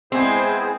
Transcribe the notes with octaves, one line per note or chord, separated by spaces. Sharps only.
G#3 B3 C4 E4 G#4 C5